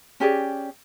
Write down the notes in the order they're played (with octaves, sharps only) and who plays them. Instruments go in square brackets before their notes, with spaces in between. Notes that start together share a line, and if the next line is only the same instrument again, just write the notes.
[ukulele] C#4 G4 G#4 D5